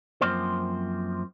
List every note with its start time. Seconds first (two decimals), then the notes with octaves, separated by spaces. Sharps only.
0.21 F#2 F3 A#3 C4 C5